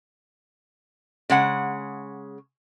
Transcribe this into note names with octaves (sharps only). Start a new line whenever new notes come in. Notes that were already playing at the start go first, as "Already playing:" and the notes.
C#3 G#3 F#5